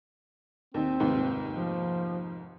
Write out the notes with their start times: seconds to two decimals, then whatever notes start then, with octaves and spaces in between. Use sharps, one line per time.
0.74 D#2 C4 D#4
1.00 F1 D#2 G#2
1.55 F3